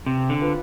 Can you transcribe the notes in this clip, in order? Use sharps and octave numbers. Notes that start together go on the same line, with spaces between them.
C3 C4
D3
F4 B4